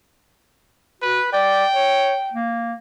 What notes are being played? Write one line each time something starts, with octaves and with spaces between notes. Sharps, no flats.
F#4 B4
D5 G5
C#5
A#3